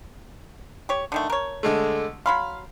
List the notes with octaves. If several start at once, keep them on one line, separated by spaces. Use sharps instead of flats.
G4 C#5
D3 D#3 A3
A#4 C#5
D3 G#3 A3
F#3 F5 B5 C6